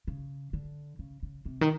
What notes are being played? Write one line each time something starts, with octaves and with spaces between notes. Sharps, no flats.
C#3
D3
C#3
C#3
C3
D#3